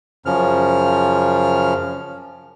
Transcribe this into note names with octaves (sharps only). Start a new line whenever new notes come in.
F#2 C#3 F3 F6